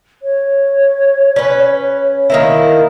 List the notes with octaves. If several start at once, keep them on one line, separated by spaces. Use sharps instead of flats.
C#5
C#4 B4
D#3 A#3 E4